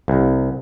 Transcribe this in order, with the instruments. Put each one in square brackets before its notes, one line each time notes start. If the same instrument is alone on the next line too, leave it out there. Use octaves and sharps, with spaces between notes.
[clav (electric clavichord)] C2